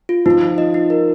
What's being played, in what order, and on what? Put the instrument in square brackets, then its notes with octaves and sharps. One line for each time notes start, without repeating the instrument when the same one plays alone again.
[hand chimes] F4
[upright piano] F3 [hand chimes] D#4
[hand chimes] D#4
D#5
D#4
A#4